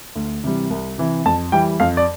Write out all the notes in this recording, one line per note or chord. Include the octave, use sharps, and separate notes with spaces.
D2
C3 E3 G3
C2
C3 E3
F2 A5
E3 G3 G5
F2 F5
D5